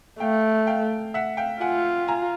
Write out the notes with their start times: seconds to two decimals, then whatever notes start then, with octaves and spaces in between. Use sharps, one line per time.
0.20 A3 F5 G5
0.67 F5 G5
1.14 E5 F#5
1.37 F5 G5
1.61 F4 F#5 G#5
2.08 G#5 A#5